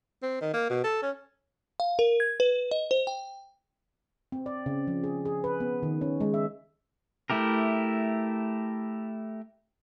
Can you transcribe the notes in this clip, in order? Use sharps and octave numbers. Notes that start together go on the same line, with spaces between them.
C4
D#3
A#3
B2
A4
C#4
F5
A#4
G#6
B4
D#5
C5
G5
C4
D5
C#3
F3
G#4
G#4
B4
B3
D#3
C#4
G#3
E5
A3 E4 G4 A#4